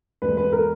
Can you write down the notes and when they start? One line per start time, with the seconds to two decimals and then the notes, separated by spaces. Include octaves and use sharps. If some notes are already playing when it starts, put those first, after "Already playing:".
0.22 E1 B4
0.37 B4
0.52 A#4